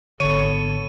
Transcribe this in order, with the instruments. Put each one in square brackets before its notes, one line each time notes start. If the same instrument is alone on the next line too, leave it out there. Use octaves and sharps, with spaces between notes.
[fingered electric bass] G#1 D3 [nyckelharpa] B3 A4 [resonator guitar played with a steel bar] C#5 [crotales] D#7